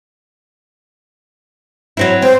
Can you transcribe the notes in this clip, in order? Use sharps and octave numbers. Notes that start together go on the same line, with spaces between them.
F#3 C4 E4
C4 C5